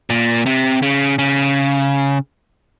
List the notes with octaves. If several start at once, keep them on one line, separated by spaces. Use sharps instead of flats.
A#2
C3
C#3
C#3